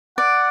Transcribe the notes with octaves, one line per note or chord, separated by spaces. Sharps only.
D5 F#5